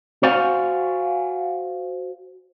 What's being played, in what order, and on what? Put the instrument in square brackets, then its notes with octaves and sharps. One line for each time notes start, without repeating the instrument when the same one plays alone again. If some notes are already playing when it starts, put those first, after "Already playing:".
[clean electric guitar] F#4 C5 D5 F5 F#5 G#5